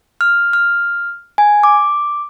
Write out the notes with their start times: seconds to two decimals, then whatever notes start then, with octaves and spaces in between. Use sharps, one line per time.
0.21 F6
0.53 F6
1.38 G#5
1.64 D6